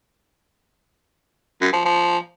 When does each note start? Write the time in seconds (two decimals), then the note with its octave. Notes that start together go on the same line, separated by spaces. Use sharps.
1.61 F#2
1.73 F3
1.85 F3